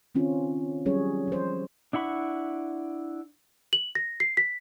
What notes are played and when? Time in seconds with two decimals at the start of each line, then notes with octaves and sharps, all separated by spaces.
0.15 D#3 C4 C#4 F4
0.86 F#3 G3 C#4 G#4 C#5
1.28 F3 C5
1.93 D4 E4 F#5 B5 C#6
3.73 F#7
3.95 A#6
4.20 C7
4.37 B6